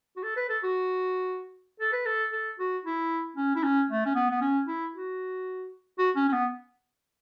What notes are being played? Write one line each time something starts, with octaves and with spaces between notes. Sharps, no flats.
F#4
A4
B4
A4
F#4
A4
B4
A4
A4
F#4
E4
C#4
E4
C#4
A3
C#4
B3
B3
C#4
E4
F#4
F#4
C#4
C#4
B3